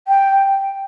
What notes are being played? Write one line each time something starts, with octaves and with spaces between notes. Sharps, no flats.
G5